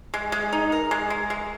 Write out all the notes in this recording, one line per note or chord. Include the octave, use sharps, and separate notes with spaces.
G#3
G#3
D#4
A#4
G#3
G#3
G#3